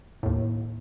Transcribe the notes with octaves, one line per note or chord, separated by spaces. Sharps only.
D#2 A2